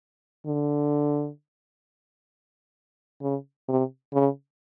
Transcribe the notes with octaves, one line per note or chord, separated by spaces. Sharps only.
D3
C#3
C3
C#3